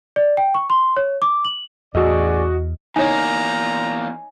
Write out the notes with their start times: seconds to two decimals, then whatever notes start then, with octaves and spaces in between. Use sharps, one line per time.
0.16 D5
0.37 G5
0.54 C#6
0.70 C6
0.97 C#5
1.22 D6
1.45 F#7
1.95 A1 E2 F#4 G#4 D5 D#5
2.96 E2 A#3 D#4 C#5 G#5 A#5